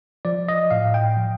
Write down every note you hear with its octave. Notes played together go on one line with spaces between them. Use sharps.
F3 D5
D#5
A2 F5
G5
F3